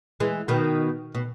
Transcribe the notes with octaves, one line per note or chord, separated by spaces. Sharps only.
E3 G#3
B2 D#3
B2